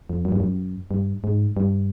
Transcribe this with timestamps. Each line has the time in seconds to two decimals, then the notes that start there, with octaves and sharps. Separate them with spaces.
0.10 F2
0.25 F#2
0.32 G2
0.40 F#2
0.91 G2
1.24 G#2
1.57 G2